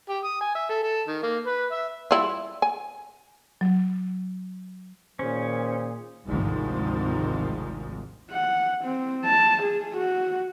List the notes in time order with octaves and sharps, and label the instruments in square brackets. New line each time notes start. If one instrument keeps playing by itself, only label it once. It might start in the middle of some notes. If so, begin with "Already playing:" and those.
[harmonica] G4
D#6
G#5
E5
A4
A4
D#3
A#3
B4
E5
[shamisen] G3 E4 F4
G#5
[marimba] F#3
[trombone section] A#2 D#3 G#4 [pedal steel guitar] C#4 [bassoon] C5
[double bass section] G#1 D2 G#2 C3 D#3 F3
[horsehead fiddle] F#5
C4
A5
G#4
F#4